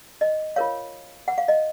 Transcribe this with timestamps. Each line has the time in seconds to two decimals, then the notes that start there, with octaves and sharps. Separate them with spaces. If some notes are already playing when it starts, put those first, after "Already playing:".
0.21 D#5
0.56 F4 A#4 C#5 F5
1.28 F#5
1.38 F5
1.48 D#5